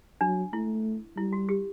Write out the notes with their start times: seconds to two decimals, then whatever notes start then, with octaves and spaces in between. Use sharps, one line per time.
0.21 F#3 D4
0.53 A3 E4
1.17 G3 E4
1.33 F#4
1.49 G4